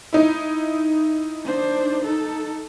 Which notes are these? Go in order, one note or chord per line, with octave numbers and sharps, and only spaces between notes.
D#4 E4
D4 C5
D#4 A4